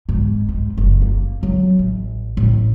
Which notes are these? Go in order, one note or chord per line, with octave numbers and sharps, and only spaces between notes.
G#2
G#2
F#1
A#3
F#3
A1
A1